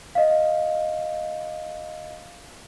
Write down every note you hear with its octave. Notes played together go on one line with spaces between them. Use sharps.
D#5 F5